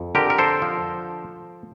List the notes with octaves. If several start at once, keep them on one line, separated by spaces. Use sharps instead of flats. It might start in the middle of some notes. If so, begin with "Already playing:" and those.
Already playing: F2
D3 G4 A#4
A#4
A4 C5
F3